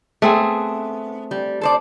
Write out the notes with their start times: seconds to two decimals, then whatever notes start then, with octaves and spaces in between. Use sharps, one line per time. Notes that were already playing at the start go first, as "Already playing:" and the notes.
0.22 A3 B3 C4 G#4
1.31 G3
1.61 A4 C5 D5